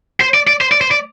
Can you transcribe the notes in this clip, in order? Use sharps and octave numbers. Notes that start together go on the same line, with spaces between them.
C5
D5
D5
C5
D5
C5
D5